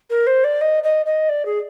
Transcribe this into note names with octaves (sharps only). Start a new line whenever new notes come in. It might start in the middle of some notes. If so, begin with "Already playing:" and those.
A#4
C5
D5
D#5
D#5
D#5
D5
G#4